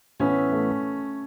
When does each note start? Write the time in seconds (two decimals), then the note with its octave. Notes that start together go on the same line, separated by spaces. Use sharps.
0.20 A2 E3 B3 C#4
0.52 A3